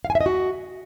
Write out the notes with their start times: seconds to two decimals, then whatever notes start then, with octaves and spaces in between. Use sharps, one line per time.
0.05 F5
0.10 G#5
0.15 E5
0.21 D#5
0.26 F#4